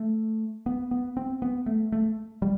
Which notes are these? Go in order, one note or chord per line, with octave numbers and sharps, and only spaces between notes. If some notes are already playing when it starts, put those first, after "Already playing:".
Already playing: A3
B3
B3
C4
B3
A3
A3
G3